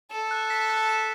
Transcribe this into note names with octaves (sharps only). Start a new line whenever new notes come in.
A4 E7
F#6
B6
F#6
E7